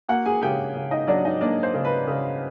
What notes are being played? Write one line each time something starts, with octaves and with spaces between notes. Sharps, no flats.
A#3 F#4 F#5
G#4 G#5
C#3 G4 G5
C#3
D#4 D#5
F#3 D4 D5
D#4 D#5
A#3 D4 D5
C5
C#3
B4
C#3